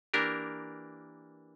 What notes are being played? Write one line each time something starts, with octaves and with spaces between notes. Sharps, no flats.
E3 A#3 D4 G4 A#4